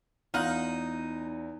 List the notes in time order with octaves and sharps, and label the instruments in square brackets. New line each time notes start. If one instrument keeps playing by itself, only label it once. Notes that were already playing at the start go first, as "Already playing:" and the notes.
[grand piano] E2 [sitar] D#4 [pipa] F4 F#5